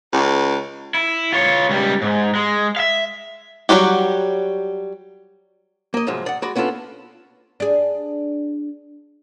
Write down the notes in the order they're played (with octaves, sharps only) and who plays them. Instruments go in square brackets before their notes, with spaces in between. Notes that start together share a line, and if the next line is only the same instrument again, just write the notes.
[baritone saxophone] C#2
[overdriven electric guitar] E4
F4 C#5
C#2 G3
G#2
G#3
E5 F5
[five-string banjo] F#3 G3 F#4 G4
[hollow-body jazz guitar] A#3 D#5
C2 G#2 F3 F#3 G#3
D5 F#5
G#3 F#4 D5 B5
B3 C#4 D4 F4 A4
[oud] D4 G#4